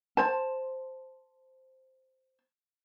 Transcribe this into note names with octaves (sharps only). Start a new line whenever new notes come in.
C5 A5